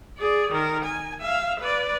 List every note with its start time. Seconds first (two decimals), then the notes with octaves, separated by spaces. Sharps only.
0.18 G#4 D5
0.52 D#3 A#4
0.85 G#5
1.21 E5 F5
1.60 B4 D5